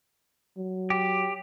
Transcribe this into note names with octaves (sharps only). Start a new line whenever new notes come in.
F#3
G4